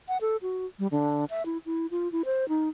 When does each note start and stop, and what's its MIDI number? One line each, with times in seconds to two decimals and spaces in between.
0.08 0.18 78
0.21 0.37 69
0.42 0.66 66
0.79 0.87 55
0.91 1.25 50
1.30 1.45 76
1.46 1.58 64
1.66 1.86 64
1.91 2.11 65
2.12 2.22 64
2.25 2.48 72
2.49 2.69 63